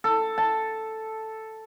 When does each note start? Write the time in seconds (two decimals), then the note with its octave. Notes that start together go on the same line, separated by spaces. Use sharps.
0.04 A4
0.38 A5